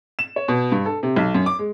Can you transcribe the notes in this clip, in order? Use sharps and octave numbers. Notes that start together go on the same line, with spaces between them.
E7
C#5
B2
G2
A4
C3
B1
F#2
D6
G#3